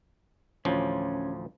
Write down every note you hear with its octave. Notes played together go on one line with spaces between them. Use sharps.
A1 D2 F3 C#4